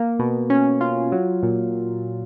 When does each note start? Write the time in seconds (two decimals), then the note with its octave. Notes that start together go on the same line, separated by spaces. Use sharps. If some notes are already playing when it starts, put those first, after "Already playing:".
Already playing: A#3
0.19 B2
0.50 C#4
0.81 F4
1.12 F#3
1.43 A#2